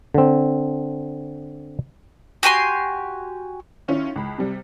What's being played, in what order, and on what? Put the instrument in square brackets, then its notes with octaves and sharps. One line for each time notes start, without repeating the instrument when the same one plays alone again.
[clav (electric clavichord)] D3 C4
[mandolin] F#4 G4 G#5 C6
[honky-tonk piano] D#3 C#4 E4 F4
C#2 B5
C3 G3